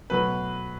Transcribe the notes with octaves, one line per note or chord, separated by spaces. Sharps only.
B2 F#3 A3 B4